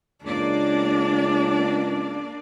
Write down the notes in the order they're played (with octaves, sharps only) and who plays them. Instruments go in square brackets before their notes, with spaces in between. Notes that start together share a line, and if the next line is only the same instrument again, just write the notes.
[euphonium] C#2 [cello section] A#3 D5 [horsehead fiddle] D4